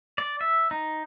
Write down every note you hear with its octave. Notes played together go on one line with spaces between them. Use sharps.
D5
E5
D#4